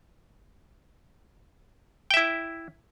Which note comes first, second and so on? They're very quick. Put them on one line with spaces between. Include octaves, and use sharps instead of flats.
G5 E5 E4